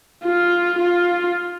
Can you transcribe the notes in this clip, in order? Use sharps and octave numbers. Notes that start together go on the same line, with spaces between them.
F4
F4